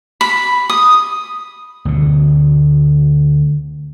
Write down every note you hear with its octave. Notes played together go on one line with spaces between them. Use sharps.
B5
D#6
D2 B2 D3